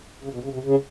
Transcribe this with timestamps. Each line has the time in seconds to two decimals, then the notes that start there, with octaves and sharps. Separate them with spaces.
0.24 C#3
0.34 B2
0.44 C#3
0.54 C3
0.64 C#3